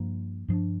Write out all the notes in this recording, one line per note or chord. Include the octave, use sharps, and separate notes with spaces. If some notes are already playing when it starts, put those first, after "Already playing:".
Already playing: G2 F3 A#3
G2 F3 D4